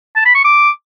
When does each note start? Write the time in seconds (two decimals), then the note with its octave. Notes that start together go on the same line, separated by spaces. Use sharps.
0.16 A5
0.25 B5
0.35 C#6
0.45 D6